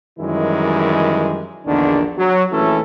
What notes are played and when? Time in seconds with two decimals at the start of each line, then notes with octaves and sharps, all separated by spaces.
0.19 F#2 D#3 E3 G3 G#3 E4
1.67 A#1 E2 D3 D#3 D4
2.18 F#3
2.52 A#1 E3 A3 C#4 E4 A4